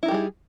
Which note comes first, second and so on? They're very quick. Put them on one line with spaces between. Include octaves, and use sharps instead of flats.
E4 D#4 G4 G3 G#4